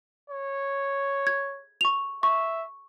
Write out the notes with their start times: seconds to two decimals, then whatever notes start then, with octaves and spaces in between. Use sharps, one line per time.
0.30 C#5
1.27 G#6
1.81 C#6 F7
2.23 E5 C#6